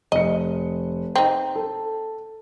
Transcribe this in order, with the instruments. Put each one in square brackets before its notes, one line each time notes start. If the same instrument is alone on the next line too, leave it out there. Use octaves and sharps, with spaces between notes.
[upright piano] F1 C#7 [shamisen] D#5
[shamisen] C4 D#4
[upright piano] A4